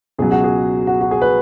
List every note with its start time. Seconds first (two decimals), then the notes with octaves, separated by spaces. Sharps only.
0.19 C#2 B2 F#3 G#4
0.31 F#4
0.44 G#4
0.87 F#4
1.01 F#4
1.11 G#4
1.22 B4